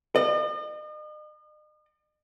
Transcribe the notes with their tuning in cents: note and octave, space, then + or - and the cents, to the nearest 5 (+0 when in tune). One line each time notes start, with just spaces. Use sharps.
D#5 -40